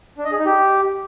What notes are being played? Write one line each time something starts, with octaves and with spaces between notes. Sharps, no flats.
D4
D#5
G#4
D#4
G4